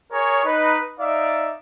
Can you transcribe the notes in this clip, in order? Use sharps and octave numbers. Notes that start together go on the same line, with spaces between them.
G#4 A#4 C#5
D#4 B4
D#4 D5 E5 F5